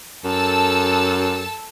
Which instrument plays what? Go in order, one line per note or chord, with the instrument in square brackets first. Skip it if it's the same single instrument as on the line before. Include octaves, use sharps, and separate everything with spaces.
[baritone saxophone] F#2 [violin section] A4 A5 E6